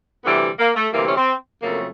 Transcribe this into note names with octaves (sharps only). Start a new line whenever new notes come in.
D2 C3 E3 G3 B3
A#3
A3
D2 C3 E3 G3 A#3
C#4
C4
F2 C#3 F#3 A3 A#3